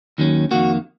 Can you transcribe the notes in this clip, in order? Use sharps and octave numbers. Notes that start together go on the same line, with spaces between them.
D#2 D#3 F#3 C#4
F2 D#3 A#3 F#4